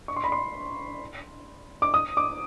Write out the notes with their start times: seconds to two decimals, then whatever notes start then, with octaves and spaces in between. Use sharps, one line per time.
0.08 C#6
0.16 C6
0.24 B5
0.32 C6
1.82 D6
1.94 D#6
2.17 D6